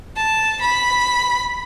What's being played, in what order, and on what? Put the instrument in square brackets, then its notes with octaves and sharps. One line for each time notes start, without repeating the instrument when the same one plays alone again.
[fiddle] A5
B5